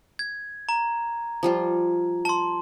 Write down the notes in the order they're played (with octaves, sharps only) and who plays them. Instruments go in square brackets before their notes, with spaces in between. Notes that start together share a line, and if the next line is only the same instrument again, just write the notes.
[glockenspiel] G#6
A#5
[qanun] F3 G3 F4
[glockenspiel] A5 C6